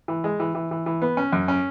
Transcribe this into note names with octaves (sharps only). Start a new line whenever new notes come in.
E3
G#3
E3
E3
E3
E3
B3
C#4
F#2
C#4